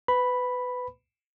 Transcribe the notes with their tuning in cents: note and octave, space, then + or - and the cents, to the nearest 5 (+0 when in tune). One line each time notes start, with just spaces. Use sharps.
B4 +20 B5 +0